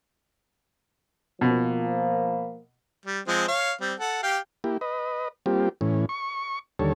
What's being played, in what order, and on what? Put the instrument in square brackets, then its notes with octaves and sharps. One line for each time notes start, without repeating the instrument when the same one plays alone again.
[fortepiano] B2 [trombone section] F3 A#3
[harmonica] G3
F3 G#3 C4
C#5 F5
G3 C4
A4 F#5
G4 F5 G5
[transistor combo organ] A#3 E4 G4
B4 D#5
G3 A#3 C4 F4 G4
A2 E3 C#4
C#6
D#2 D3 G3 A4 C#5